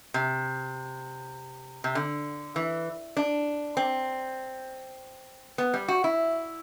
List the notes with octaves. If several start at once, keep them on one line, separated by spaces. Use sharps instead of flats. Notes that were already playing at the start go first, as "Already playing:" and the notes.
C3
C3
D3
E3
D4
C4
B3
G3
F#4
E4